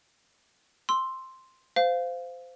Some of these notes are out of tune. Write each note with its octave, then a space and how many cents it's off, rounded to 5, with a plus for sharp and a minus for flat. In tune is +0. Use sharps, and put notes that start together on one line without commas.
C6 +0 E6 +0
C5 -20 F5 +0